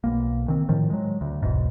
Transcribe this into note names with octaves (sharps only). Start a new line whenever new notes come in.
B1 A#3
D#3 C4
A2 D#3 F3
F#3 G#3
D2
E1 B1 G#2